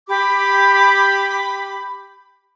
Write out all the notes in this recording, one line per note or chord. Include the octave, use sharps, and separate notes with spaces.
G4 B5 D6